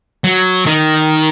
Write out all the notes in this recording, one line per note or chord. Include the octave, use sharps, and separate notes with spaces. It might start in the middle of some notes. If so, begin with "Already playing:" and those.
F#3
D#3